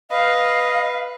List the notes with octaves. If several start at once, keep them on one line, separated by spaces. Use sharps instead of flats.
B4 D#5 F5